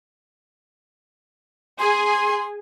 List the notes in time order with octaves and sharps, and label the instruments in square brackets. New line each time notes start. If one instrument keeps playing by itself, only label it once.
[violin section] G#4 G#5 [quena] C6